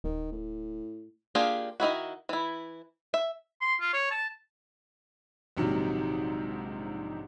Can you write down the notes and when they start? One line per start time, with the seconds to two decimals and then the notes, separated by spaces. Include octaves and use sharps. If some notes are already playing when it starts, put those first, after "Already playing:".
0.04 D1 D#3
0.32 A2
1.35 A#3 D4 F4 G4 G#4
1.80 D#3 D#4 E4 F#4
2.29 E3 E4
3.14 E5
3.61 C6
3.81 F4
3.93 C#5
4.11 A5
5.57 A#1 G#2 C3 D#3 F#3